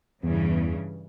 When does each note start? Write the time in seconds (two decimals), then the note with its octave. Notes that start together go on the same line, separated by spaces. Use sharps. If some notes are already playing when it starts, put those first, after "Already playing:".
0.23 E2 G2 C#3 E3